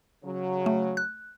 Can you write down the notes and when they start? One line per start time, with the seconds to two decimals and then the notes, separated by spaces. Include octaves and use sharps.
0.25 C#3 F#3
0.66 A3
0.97 F#6